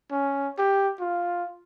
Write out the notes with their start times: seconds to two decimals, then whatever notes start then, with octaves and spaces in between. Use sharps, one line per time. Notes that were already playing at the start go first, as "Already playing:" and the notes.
0.11 C#4
0.58 G4
1.00 F4